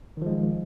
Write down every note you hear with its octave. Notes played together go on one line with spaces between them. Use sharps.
D#3 F3 G#3